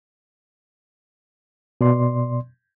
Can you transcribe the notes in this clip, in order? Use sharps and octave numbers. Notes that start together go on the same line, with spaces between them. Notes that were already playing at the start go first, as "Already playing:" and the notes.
B2 D5 C6